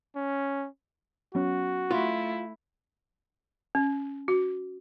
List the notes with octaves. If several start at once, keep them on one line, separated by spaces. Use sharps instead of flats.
C#4
F#3 B3 C#4 F#4
A3 E4 F4
C#4
F#4